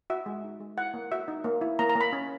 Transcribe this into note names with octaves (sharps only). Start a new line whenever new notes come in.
F#4 E5
G#3
D#4
G#3
E4 F#5
A#3
F#4 E5
D#4
A#3
E4
A#3 A#5
A#5
A#3
B5
C#4